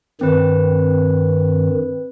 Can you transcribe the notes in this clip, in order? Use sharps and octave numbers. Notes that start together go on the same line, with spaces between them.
G2 D#3 C4 B4